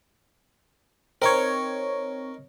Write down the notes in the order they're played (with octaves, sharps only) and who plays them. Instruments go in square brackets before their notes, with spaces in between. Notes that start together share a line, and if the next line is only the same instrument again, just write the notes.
[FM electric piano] C4 C#5 [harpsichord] D#4 A#4